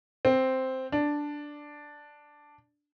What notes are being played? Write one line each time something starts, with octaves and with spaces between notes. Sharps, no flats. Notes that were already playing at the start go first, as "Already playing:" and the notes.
C4
D4